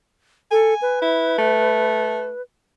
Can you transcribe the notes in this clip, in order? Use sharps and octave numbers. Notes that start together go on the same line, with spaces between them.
A4 G#5
B4
E4
A3